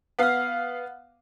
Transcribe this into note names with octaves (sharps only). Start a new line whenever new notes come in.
B3 F5 F#5 F6